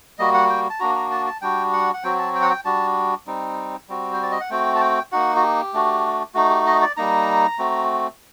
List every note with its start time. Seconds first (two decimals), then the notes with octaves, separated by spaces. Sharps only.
0.19 G3 A#3 F#4 D#5
0.34 F#5
0.49 G5
0.70 A5
0.80 A#3 D4 F#4 A#5
0.96 A#5
1.11 A5
1.27 A5
1.41 G3 D4 F#4 G5
1.73 F#5
1.93 F#5
2.03 F#3 C4 F#4 G5
2.19 A5
2.35 G5
2.42 F#5
2.50 G5
2.65 G3 D4 F#4 A5
3.27 G3 C4 D#4
3.89 G3 C4 F#4
4.13 C5
4.23 D5
4.31 D#5
4.41 F#5
4.50 A3 C4 F#4 G5
4.75 A5
4.81 G5
5.12 A#3 D#4 F#4 F#5
5.36 F#4
5.42 G4
5.74 A3 D4 F#4
6.35 A3 D#4 F#4
6.50 G4
6.66 D#5
6.82 D5
6.97 G3 A#3 D#4 A#5
7.58 A3 C4 F#4